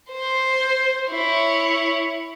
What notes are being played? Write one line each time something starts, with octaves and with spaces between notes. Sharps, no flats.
C5
E4 C#5